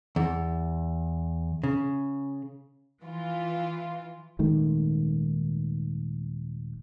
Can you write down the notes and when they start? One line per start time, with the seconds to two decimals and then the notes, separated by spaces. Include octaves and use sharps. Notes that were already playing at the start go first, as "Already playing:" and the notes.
0.16 E2
1.63 C#3
3.03 E3 F4
4.39 D#1 G#2 D#3 A3